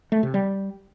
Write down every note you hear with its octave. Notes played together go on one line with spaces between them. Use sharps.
A3
C3
G3